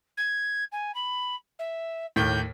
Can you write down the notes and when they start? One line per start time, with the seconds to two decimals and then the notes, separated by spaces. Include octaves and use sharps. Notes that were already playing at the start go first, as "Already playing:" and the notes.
0.17 G#6
0.72 G#5
0.94 B5
1.59 E5
2.16 D#2 A2 G6